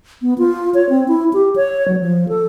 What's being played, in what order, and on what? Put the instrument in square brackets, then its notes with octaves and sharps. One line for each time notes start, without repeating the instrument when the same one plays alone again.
[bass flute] B3
F4
C#5
C4
E4
G4
C#5
F#3
F3
A4